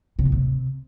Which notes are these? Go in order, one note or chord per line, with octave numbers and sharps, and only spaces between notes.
C#3
A2
C3